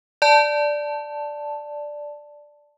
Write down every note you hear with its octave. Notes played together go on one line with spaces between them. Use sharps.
D5 A5